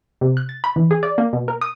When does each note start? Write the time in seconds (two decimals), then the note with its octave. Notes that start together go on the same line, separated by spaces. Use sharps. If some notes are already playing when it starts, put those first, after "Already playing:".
0.21 C3
0.37 F#6
0.49 A6
0.64 B5
0.76 E3
0.91 G#4
1.03 D5
1.18 A#3
1.33 B2
1.48 A#4
1.61 D#6